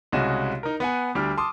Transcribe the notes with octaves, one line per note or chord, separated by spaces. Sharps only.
C2 C#3 G#3 F#4 D#5 E7
D#4 A#4
B3 F#5 G#5
D2 G3 D4 F6
A5 C6 D6 D#6